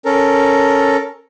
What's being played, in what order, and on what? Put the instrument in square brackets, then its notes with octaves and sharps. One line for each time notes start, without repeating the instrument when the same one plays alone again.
[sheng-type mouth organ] C#4 A4 A#4